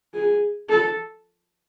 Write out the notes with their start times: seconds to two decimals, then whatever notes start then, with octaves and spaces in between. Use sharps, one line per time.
0.14 G#4
0.69 A4